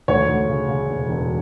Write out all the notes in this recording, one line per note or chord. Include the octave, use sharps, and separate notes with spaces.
D2 C#5
D2
C#3
C#3
E1
E1